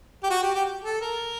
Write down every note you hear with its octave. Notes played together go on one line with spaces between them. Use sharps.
G4
F#4
G4
G4
A4
A#4